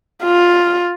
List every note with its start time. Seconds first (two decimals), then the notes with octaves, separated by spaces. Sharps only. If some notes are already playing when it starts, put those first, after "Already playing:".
0.23 F4